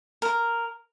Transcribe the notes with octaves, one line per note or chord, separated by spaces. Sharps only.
A#4